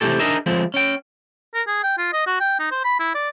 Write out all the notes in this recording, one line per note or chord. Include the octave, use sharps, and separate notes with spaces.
C3 E3 G#3 A3 G4 A4
D4 D#4 G#4 A#4 E5
F3 G#3 A3 C4
C#4 G5
A#4
G#4
G5
F4
D#5
F#4
G5
D#4
C5
B5
E4
D5